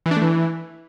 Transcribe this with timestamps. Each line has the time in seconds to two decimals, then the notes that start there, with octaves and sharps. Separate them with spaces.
0.06 E3
0.11 D4
0.16 A3
0.22 E3